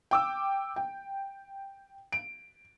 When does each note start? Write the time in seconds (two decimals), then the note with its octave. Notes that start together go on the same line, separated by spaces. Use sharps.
0.11 G5 D6 E6
0.76 G5
2.12 D7